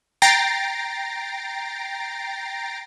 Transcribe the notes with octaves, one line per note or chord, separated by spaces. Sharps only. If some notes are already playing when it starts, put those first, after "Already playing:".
G5 A#5 A6 A#6 C7 D7